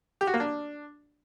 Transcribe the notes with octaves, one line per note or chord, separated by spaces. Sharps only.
G4
F#4
A#3
D4